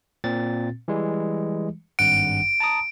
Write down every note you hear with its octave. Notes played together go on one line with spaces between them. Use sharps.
A#2 C4 A6
E3 G3 G#3
G#1 G2 F#5 D7
A5 A#5 D#6